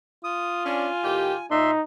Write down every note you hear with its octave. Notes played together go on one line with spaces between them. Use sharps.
F4 D#6
C#4 D4 G#5
A2 D#3 G4
A#2 D#4 E5 C6